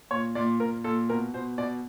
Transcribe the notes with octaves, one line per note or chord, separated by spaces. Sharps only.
A#2 C#5
A#2 D5
A#2 A#4
A#2 A4
B2 A#4
B2 C5
B2 D5